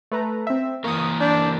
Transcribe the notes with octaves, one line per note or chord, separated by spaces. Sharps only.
A3 B4 A#5
C4 E5
E3 A#3 A#4 C#6 D#6
D4 G6